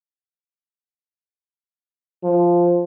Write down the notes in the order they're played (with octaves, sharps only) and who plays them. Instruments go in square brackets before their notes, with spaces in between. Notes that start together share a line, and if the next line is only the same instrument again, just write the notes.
[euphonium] F3